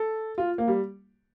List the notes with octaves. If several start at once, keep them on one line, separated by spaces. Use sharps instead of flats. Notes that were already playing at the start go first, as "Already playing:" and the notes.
Already playing: A4
F4
A#3
G3